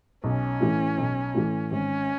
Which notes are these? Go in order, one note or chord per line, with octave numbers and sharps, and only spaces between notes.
B1 C#4
A2 E3
B1
A2 E3
G#1 C#4